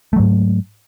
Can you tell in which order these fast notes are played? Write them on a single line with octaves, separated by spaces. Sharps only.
A3 F#3 G#2